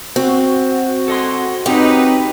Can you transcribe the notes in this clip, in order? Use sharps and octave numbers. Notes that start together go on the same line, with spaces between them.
C4 F#4
A4 D#5 C6
C4 D#4 G4 B4 C#5